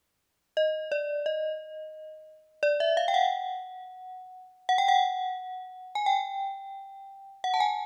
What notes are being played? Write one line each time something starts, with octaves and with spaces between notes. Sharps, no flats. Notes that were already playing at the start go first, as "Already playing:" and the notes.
D#5
D5
D#5
D5
E5
F5
G5
F#5
F#5
G5
F#5
G#5
G5
F#5
A5
G#5